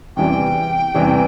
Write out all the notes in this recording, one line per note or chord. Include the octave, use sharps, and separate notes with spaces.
E2 C3 E3 G3 G5
E2 C3 E3 G3